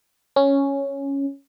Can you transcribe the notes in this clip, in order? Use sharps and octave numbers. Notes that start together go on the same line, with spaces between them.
C#4